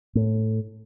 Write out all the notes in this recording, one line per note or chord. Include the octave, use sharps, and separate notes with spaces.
A2